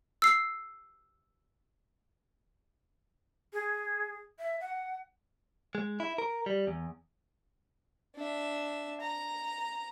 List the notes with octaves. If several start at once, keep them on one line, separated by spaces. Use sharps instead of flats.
E6 C7
G#4
E5
F#5
G#3
E4
A#4
G3
E2
D4 E5
A#5